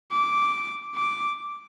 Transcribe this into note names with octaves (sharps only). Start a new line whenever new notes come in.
D6
D6